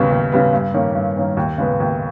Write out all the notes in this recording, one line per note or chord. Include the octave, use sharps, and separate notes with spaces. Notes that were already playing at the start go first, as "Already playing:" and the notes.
Already playing: D#2 C#3 G3 B3
D#2
C#3 G3 B3
G2
D#3 A#3 C#4
G2
D#3 A#3 C#4
D#2
C#3 G#3 B3
D#2